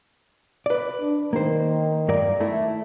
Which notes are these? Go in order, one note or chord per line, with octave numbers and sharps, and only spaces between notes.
B4 D5
D4
D#3 A#3 C5
G2 A#4 D5
A3 E4